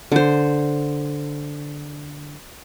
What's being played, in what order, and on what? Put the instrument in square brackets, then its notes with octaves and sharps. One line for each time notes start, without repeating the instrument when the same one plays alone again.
[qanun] D3 C5